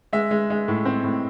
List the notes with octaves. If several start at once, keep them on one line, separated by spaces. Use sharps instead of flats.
G#3 E5
G#3
G#3
A2
C4
A2